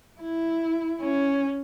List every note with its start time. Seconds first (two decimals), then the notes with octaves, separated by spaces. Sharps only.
0.21 E4
1.02 C#4